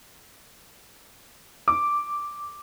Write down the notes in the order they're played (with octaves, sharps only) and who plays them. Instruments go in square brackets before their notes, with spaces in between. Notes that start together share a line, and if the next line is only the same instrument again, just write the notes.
[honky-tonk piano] D6